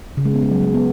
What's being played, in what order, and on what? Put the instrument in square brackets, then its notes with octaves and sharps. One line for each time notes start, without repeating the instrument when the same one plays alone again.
[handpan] C#3
G#3
B3
G#3
F#3
G#3
B3